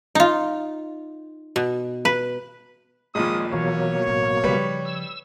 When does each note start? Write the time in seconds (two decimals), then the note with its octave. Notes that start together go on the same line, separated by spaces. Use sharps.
0.15 D#4 F4
1.56 B2
2.05 B4
3.15 A#1 D#2 F3 G#3 C#4 G#4 D#6
3.53 B2 E3 F#3 A#3 C#5
4.07 A1
4.44 C#3 F3 G3 B4
4.85 E6